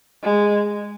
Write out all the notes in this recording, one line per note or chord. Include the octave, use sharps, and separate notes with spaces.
G#3